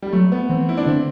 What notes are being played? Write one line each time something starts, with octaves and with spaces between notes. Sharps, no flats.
G3
F#3 A3
B3
E3 C4
E4
D4
D3 C4